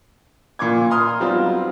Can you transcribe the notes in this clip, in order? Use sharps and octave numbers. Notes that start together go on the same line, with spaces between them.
A#2 F4 D6 G#6
A#5 C6 D#6 F6
F#3 G3 B3 C4 D#4 F4